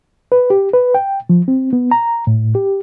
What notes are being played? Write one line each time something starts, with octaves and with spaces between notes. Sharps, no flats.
B4
G4
B4
G5
F3
C4
B3
A#5
A2
G4